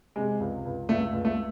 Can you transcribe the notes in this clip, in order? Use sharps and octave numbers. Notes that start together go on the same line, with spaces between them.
C3 G#3
C#2
C#2
C#2 A3
C#2
A3